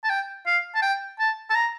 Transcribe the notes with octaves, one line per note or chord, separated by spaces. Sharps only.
A5
G5
F5
A5
G5
A5
A5
A#5